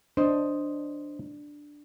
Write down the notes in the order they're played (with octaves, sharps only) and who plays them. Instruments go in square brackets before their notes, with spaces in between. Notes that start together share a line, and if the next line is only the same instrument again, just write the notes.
[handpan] D4 [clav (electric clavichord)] C5 D#5